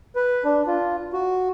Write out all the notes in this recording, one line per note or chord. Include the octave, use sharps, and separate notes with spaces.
B4
D4
F4
F#4